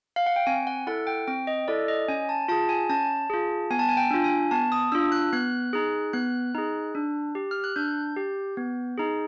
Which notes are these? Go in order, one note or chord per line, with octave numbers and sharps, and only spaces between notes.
F5
F#5
G5
C4 G#5
F#5
E4 A4 F#5
G5
C4 G5
D#5
E4 A4 D5
D#5
C#4 G#5
A5
F4 G#4 A5
G#5
C#4 A5
F4 G#4
B3 G#5
A5
G#5
G5
D4 F4
G#5
B3 A5
D#6
D4 F4 E6
F#6
B3 F#6
D#4 G#4
B3 F#6
D#4 G#4
D4
G4
F6
F#6
D4 G6
G4
B3
D#4 G#4